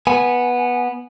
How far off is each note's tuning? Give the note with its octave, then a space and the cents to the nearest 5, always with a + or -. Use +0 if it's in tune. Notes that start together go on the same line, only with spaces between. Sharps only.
B3 -10 G#5 +0